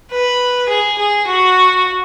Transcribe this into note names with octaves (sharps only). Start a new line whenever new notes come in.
B4
G#4
G#4
F#4